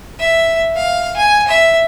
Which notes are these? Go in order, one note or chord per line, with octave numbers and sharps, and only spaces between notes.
E5
F5
G#5
E5